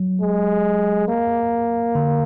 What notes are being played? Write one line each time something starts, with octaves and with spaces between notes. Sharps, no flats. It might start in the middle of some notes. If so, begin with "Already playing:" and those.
Already playing: F#3
G#3
A#3
D3